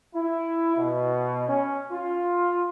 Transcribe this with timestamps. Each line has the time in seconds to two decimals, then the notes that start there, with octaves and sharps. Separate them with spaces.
0.14 E4
0.77 B2
1.47 C#4
1.91 F4